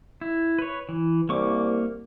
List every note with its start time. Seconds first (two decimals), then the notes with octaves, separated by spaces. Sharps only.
0.21 E4
0.59 B4 C#5
0.89 E3
1.29 C2 A#3 C#6 D6